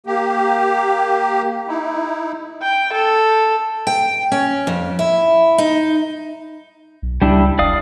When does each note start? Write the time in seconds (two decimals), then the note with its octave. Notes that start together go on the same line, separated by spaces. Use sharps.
0.07 A#3 G4
1.68 D#4 E4
2.62 G5
2.93 A4
3.87 G5
4.32 C#4
4.67 F2
4.99 E4
5.58 D#4
7.02 B1
7.22 C#2 G3 D4 E4
7.59 F1 D5 F5 D#6